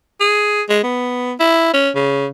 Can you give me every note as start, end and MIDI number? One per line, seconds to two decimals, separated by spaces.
0.20 0.62 68
0.69 0.79 56
0.83 1.32 59
1.40 1.72 64
1.73 1.90 61
1.95 2.27 49